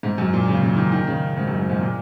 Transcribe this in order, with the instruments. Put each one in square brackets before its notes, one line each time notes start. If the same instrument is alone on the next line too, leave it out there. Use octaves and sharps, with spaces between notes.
[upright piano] G#2
F#2
A#2
C#3
C#3
D#3
D#3
C#3
G#2
F#2
G#2
G#2
A#2